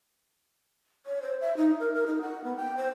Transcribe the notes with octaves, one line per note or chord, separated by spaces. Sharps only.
C#5
C5
E5
D#4
A#4
A#4
D#4
F#5
B3
G5
C5